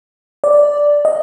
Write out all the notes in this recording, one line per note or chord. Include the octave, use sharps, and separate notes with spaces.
D5
D#5